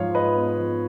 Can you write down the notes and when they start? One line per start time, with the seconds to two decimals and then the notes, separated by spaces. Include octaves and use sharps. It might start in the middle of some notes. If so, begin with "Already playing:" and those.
Already playing: G#2 F3 C#5 F5
0.14 G#3 B4 D#5
0.36 B3
0.58 F3